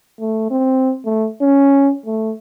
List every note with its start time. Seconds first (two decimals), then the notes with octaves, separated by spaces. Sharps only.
0.20 A3
0.51 C4
1.06 A3
1.41 C#4
2.06 A3